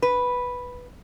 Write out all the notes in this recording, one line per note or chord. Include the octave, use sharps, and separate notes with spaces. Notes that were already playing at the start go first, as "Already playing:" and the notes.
B4